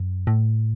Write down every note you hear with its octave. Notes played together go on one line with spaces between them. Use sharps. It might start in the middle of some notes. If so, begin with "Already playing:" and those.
Already playing: F#2
A2